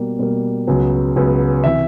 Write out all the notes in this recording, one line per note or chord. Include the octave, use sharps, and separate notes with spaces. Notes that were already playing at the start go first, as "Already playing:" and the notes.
Already playing: B2 G3 A#3
B2 G3 A#3
C#2 C#3 F#3 B3
C#2 C#3 F#3 B3
C3 E3 E5